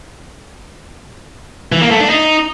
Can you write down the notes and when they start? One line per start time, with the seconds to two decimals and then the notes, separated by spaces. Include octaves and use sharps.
1.72 E3
1.82 A#3
1.91 A3
2.00 D4
2.10 D#4